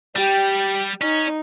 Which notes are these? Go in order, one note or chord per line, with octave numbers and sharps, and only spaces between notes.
G3 G4
C#4 D#4